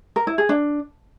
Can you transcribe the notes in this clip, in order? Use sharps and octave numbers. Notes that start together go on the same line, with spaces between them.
A#4
E4
G#4
D4